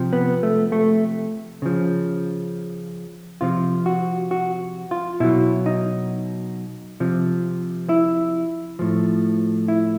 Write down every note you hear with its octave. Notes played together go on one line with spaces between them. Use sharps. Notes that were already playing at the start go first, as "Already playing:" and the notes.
Already playing: C3 F3
B3
A3
A3
C#3 F3
C3 F3 F4
F#4
F#4
F4
B2 F#3 E4
D#4
C3 F3
E4
A2 F3
E4